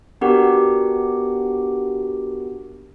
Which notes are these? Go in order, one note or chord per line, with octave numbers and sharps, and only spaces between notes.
B3 D4 F#4 G4 A#4 F#5